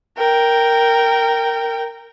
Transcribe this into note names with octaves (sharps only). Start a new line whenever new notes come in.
A#4 G5